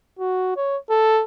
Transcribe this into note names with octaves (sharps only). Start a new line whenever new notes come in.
F#4
C#5
A4